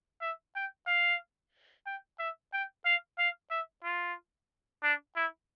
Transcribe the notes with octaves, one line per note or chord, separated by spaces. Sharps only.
E5
G5
F5
G5
E5
G5
F5
F5
E5
F4
D4
E4